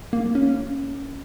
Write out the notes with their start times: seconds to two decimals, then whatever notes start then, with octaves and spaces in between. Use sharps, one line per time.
0.13 A#3
0.35 C#4